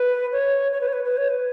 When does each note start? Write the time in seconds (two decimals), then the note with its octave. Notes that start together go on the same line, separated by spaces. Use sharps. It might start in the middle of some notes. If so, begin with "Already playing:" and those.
Already playing: B4
0.32 C#5
0.72 C#5
0.81 B4
0.88 C#5
0.93 B4
1.05 B4
1.17 C#5
1.29 B4